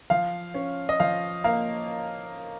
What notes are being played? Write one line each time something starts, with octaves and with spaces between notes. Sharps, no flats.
F3 F5
C#4
D#5
F3 F5
A#3 F5